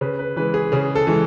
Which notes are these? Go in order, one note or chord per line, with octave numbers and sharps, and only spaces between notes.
C#3 B4
B4
E3 G#3 B4
G#4
C#3 G#4
A4
E3 G#3